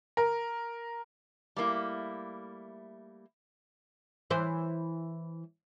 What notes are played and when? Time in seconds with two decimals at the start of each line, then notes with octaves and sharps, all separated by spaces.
0.17 A#4
1.56 G3 A3 A#3 E4
4.30 E3 C5